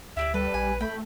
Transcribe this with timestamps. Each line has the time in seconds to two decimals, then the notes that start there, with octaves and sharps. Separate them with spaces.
0.17 D2 E4 G4 D5 E5
0.34 G3 A4 B4
0.54 A#1 G#5
0.81 A3 G5 B5